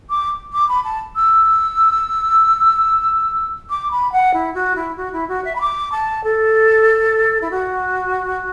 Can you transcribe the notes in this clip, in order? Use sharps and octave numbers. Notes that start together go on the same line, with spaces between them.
D6
D6
B5
A5
E6
D6
B5
F#5
E4
F#4
E4
F#4
E4
F#4
E5
B5
D6
A5
A4
E4
F#4